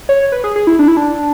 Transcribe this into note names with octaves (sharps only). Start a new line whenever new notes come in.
C#5
B4
G#4
G#4
E4
D4
E4
D4